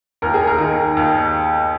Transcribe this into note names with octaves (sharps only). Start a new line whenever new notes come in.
D#2 A#4
G#4
A#4
D#3
D#2